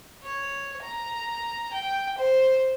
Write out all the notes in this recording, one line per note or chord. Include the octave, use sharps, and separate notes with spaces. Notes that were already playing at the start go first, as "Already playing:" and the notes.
C#5
A#5
G5
C5